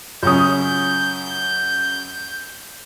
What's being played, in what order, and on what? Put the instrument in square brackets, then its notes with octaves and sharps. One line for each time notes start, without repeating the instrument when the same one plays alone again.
[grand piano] F#2 C#3 C#4 [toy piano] F4 D#6 [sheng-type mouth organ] G6